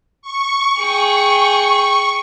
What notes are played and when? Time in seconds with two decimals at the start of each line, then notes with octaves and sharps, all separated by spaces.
0.22 C#6
0.79 G#4 G5